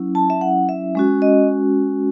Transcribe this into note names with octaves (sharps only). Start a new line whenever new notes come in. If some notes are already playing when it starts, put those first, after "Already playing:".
Already playing: F#3 C#4 E4
A5
E5
F#5
E5
G#3 C#4 F#4
D#5